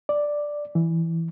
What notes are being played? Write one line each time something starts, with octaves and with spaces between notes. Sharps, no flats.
D5
E3